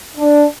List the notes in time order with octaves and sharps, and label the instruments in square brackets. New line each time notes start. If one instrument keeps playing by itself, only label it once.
[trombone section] D4